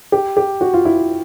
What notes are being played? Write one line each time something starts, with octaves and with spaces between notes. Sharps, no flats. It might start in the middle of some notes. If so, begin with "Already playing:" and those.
G4
G4
F#4
F4
E4